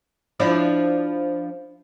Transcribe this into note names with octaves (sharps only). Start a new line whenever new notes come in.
F3 D4 E4